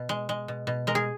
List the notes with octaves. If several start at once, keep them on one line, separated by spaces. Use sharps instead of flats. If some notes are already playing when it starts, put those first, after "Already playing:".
Already playing: B2
G#3
G#3
B2
B2
G#3 A#4
G#4